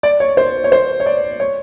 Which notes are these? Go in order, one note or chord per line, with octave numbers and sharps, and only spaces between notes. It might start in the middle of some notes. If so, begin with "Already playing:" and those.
D5
C#5
C5
C#5
C5
C#5
D5
C#5